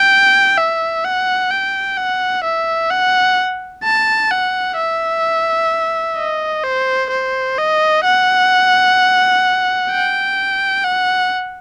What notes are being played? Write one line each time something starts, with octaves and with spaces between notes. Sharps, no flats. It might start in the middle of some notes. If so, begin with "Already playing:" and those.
Already playing: G5
E5
F#5
G5
F#5
E5
F#5
A5
F#5
E5
D#5
C5
C5
D#5
F#5
G5
F#5